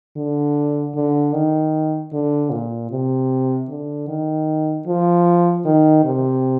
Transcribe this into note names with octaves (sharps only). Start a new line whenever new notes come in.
D3
D3
D#3
D3
A#2
C3
D3
D#3
F3
D#3
C3